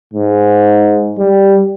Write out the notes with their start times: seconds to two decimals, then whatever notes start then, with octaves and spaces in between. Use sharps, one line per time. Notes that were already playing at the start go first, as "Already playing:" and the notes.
0.13 G#2
1.18 G3